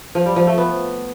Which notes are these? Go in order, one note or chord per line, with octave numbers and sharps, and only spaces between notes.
F3
G3
F3
A3
B3